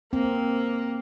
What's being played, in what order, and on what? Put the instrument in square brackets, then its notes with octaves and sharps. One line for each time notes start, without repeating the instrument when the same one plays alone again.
[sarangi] A#3 [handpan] C4